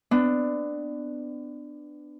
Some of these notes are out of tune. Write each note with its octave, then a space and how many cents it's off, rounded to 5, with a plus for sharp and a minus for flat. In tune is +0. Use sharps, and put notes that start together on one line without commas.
B3 +30 D4 +15